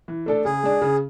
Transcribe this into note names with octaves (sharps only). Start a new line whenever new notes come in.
E3
A3 D4 A4
C#3 G#4
G#3 D4
C#3